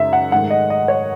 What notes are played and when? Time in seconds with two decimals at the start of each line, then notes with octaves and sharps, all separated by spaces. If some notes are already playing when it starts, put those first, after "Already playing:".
Already playing: F#2 C#3 G#3 D#4 E5
0.13 F#5
0.32 G#2 D#3 A3 F#5
0.50 D#5
0.70 D#5
0.88 C#5